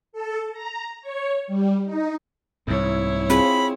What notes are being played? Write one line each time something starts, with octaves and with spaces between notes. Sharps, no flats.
A4
A#5
C#5
G3
D#4
C2 G#2 E4 C#5
C4 F4 G#4 B5